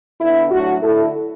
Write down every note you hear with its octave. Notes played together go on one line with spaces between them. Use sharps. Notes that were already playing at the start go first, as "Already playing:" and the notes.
D3 B3 D4 E4
A2 F#3 A3 D4 F#4
D3 A3 D4 E4 A4